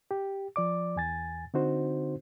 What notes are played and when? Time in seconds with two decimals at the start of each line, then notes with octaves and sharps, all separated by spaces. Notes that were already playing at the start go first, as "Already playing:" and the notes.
0.11 G4
0.56 F3 D5 D6
0.96 E2 G#5 A6
1.54 D3 C4 D#4 F#4 C5